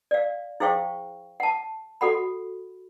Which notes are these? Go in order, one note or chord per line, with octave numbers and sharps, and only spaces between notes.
D5 F5
E4 G#4 C5 F5 G5 C#6
F#5 A5
F#4 A4 F#5 B5